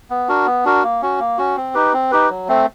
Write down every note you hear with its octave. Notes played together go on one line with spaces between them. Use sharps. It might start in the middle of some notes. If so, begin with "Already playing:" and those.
B3
D4 F#4 A#4
B3
D4 F#4 A#4
A#3
C#4 F#4
A#3
C#4 F#4
C4
D#4 G4 B4
C4
D#4 G4 B4
F#3
A3 C4